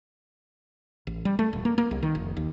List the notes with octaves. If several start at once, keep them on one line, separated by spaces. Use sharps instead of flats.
A1
G3
A3
D#1
A#3
A#3
C2
D#3
F1
D#2